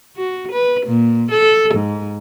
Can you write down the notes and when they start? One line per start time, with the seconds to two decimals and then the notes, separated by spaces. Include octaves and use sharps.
0.16 F#4
0.52 B4
0.86 A#2
1.31 A4
1.74 G#2